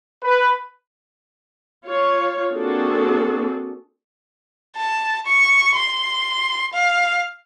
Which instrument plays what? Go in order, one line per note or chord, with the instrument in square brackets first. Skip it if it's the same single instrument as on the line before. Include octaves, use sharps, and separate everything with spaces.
[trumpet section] B4
[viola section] F4 C#5
A#3 C4 D4 F#4 G#4 A4
[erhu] A5
C#6
C6
F5